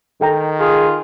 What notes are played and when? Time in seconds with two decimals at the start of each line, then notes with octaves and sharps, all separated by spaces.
0.21 D#3 A4 G5 A#5
0.60 F4 G#4